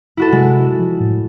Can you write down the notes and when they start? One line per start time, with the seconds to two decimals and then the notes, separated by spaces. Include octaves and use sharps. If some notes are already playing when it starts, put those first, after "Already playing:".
0.17 E4 F#4 A4
0.32 C3 G#3
0.79 F3
1.00 A2